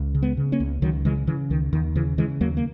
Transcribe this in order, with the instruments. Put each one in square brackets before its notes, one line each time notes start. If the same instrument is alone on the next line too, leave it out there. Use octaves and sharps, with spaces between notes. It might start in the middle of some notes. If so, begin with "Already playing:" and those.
Already playing: [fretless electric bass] C#2
C#3
G#3 B3
C#3
A#3 C#4
C#2
C#2 D#3 F#3
C#3 E3 G#3
C#3 E3
C#2 D#3
D#2 D#3
C#3 E3
C#3 E3 G#3
D#2 F#3 A#3
A#3